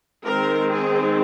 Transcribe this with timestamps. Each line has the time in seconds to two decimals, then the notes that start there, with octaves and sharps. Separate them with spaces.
0.25 D#3 G#3 C4 A#4
0.71 G#4